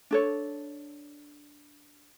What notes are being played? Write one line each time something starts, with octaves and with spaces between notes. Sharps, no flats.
D4 A4 C#5